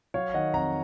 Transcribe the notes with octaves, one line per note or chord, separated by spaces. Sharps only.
F#3 C#5 F5
D#3 D#5 F#5
F2 F#5 A#5